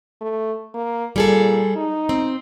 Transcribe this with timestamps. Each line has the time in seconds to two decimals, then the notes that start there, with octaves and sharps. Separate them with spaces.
0.21 A3
0.74 A#3
1.16 A#2 G3 G#4 A4
1.76 D#4
2.09 C4